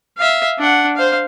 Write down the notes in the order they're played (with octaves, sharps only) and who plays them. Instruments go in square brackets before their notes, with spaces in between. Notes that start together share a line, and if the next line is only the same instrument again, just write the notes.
[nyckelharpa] E5 F5
D4 F#5
C5 F5